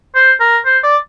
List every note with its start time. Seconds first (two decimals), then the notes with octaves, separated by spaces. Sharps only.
0.15 C5
0.40 A#4
0.66 C5
0.83 D5